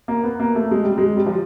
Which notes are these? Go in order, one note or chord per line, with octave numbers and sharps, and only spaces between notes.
A#3
B3
A#3
A3
G#3
G3
G#3
G3
F3